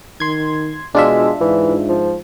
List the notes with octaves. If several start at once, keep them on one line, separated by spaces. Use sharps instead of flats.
D#3 C6 G#6
B2 G#3 D4 F4 E5
G#2 E3
F3